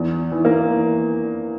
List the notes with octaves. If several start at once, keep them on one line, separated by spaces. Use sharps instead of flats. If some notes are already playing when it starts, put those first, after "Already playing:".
Already playing: E2
E3
A#3
E3